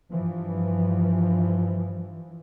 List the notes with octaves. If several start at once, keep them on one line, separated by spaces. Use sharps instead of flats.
G2 E3 F3